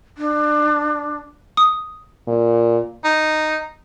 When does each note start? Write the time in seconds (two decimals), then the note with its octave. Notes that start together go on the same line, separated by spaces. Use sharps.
0.18 D4
1.57 D#6
2.28 A#2
3.05 D#4